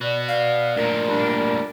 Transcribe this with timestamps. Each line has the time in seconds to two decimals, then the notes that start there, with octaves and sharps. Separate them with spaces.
0.01 F#4 B4 D5
0.28 D5 F5
0.77 D2 A#2 A#4
1.07 G3 D4